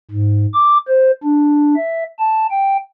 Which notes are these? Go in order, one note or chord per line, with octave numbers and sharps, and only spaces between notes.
G#2
D6
C5
D4
E5
A5
G5